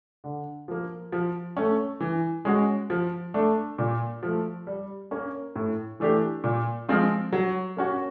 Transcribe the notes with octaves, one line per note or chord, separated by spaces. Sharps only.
D3
F3 A#3
F3
A3 C#4
E3
G#3 C#4 F#4
F3
A3 D4
A#2
F3 A3
G3
A#3 C#4
A2
E3 A3 D4 G4
A#2
F3 G#3 C4 F4
F#3
A#3 C#4 F#4